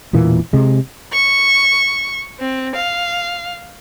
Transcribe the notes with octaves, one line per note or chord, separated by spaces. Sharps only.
E1 A#2 E3 A#3
C3 G#3
C#6
C4
F5